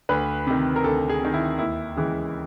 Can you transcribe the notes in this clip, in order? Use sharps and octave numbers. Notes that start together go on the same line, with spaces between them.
D2 B4
C3 D#3
A#4
D2 A4
G#4
C3 D#3
E4
D#2 E4
C#3 E3 G#3